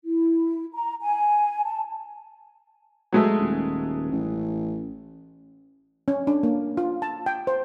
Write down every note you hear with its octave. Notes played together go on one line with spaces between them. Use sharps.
E4
A#5
G#5
A5
F#3 G#3 A3
D#1
A1
C#4
D4
A#3
F4
A5
G5
C5